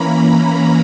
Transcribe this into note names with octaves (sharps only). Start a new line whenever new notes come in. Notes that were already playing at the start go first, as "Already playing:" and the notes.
Already playing: E3 A#3 C#4 A#5 B5
B5